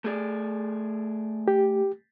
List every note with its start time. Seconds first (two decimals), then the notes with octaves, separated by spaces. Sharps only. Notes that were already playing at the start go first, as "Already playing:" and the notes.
0.05 A3 G#4 D5
1.48 G4